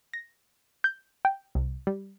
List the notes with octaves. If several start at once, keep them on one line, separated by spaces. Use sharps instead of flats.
A#6
G6
G5
C2
G3